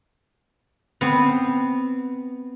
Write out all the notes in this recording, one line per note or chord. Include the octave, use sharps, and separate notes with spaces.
B3 C4